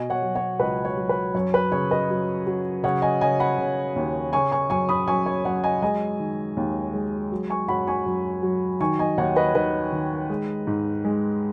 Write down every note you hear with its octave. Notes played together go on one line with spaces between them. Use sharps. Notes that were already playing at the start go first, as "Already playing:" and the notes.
Already playing: B2 D#5 G#5
C#5 F#5
F#3
C#5 F#5
C#2 B4 D#5
C#5
F#3
B4
F#2 C#5
B4
C#3 C#5
B4 D#5
F#3
F#3
C#3 C#5 F#5
D#5 G#5
C#3 D#5 G#5
F#5 B5
C#3
D#2
C#3 G#5 C#6
G#5 C#6
F#2 G#5 C#6
B5 D#6
F#2 G#5 C#6
C#5
F#2 C#5 F#5
D#5 G#5
G#3 D#5 G#5
D#3
D#2
G#3
F#3
G#5 C#6
F#2 F#5 B5
G#5 C#6
F#2
F#3
D#3 G#5 C#6
D#5 G#5
D#2 C#5 F#5
B4 D#5
D#3 B4 D#5
D#3
G#3
G#2
G#3